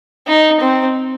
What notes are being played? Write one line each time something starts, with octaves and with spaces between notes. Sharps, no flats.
D#4
C4